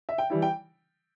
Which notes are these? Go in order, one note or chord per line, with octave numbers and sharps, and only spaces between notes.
E5
G5
E3 G3 E4
G5